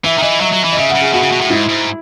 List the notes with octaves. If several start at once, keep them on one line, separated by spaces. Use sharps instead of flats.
E3 E5
D#3
E3 D#5
F#3 E5
F#3
E3
D#5
C#3 E5
F#5
C#3
G#4
B2 F#4
C#3
B2
A2
G#2 E4
G#2